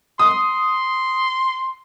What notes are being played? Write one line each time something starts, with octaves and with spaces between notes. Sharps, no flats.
C6 D#6